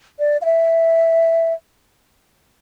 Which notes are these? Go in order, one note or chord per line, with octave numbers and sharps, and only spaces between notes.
D5
F5
E5